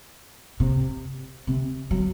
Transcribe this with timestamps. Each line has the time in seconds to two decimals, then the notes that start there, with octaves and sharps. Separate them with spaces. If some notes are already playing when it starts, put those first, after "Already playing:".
0.60 C3
1.47 C3
1.91 F#3